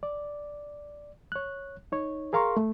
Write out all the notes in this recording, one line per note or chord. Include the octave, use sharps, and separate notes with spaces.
D5
C#5 F#6
D#4 C#5
G#4 A#4 F5 A#5 C6 C#6
A3